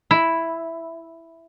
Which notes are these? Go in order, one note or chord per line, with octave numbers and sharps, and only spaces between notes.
E4